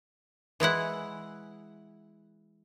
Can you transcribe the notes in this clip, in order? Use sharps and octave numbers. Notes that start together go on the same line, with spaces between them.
E3 G#3 E4 F#5